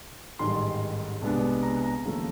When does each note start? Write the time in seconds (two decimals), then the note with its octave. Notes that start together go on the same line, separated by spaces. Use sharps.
0.39 A1 G#2 D#3 G3 C6
1.22 C2 B2 G#3 B3 D4
1.63 A#5
1.84 A#5
2.05 D#2 C#3 F3 A3